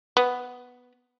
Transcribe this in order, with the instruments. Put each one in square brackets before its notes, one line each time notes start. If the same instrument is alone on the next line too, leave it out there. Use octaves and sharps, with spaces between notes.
[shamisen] B3